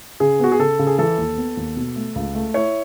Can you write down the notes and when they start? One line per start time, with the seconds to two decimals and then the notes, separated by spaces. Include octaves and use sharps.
0.20 C#3 G#4
0.40 B3 F#4
0.52 G#4
0.59 C#3 A4
0.79 C#3
0.87 G#4
0.98 E3 A4
1.18 D#2
1.37 B3
1.57 D#2
1.76 B2
1.96 A3
2.16 C#2
2.35 A3
2.54 E4 C#5